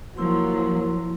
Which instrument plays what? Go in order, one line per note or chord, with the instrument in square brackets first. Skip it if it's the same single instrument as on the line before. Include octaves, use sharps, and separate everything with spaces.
[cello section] F3 [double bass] F#3 [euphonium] A#3 [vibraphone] E4 C6